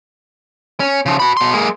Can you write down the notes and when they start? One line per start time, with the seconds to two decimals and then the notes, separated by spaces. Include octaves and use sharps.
0.80 C#4
1.06 C#3 F3
1.20 F#4 B5
1.37 B2 C6
1.53 G#3 A#3